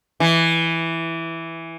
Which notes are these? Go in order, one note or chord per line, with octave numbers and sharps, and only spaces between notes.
E3